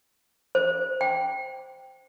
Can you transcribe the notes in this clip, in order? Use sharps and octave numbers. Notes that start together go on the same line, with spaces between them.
C5
G5